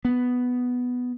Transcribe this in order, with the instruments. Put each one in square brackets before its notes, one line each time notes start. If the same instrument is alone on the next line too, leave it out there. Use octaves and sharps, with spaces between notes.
[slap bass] B3